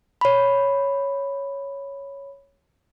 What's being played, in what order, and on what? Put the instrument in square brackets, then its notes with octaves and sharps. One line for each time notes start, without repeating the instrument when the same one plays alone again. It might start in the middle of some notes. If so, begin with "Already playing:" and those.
[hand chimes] C#5 B5